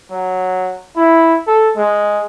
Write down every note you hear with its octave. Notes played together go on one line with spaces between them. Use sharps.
F#3
E4
A4
G#3